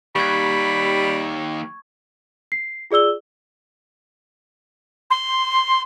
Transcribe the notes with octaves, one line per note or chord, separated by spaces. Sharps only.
D#2 G3 B5 C#6 G#6
C7
F4 G#4 D5 E6 G7
C6